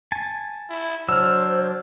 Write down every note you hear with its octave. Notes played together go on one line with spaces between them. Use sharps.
G#5 A5
E4
F#3 D4 C5 E6 F6